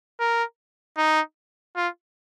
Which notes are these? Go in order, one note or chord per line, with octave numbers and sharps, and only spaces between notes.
A#4
D#4
F4